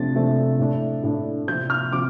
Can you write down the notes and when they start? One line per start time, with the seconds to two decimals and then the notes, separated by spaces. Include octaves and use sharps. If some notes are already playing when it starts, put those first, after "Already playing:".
Already playing: C3 F3 A3 D4 A6
0.15 C3 F3 A3 D4
0.59 A2 A3 D4
1.03 A2 A3 D4
1.47 C3 F3 C4 G6
1.70 F6
1.93 C3 F3 D6